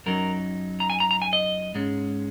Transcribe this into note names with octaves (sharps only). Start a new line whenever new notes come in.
F#2 F#3 D#4 A#4
A#5
G#5
A#5
A#5
G#5
D#5
G#2 G#3 C#4